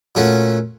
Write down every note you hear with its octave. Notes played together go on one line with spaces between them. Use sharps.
A#2 A3 C#4 F#4